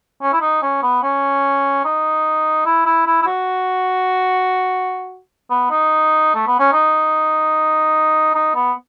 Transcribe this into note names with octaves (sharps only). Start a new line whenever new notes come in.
C#4
E4
D#4
C#4
B3
C#4
D#4
E4
E4
E4
E4
F#4
B3
D#4
A3
B3
C#4
D#4
D#4
B3